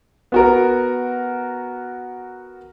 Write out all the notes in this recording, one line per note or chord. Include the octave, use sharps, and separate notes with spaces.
B3 F#4 A#4